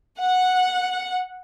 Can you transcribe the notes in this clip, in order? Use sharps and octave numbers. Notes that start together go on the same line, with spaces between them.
F#5